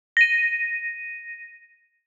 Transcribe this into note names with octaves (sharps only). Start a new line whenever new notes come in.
A#6 D#7